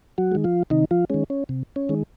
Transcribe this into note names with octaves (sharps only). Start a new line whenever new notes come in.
F#3 F#4
D#3 G#3
F3 F4
C3 D#3 D#4
F3 F4
D#3 G#3 C#4
C#4
C3
C#4
D#3 G#3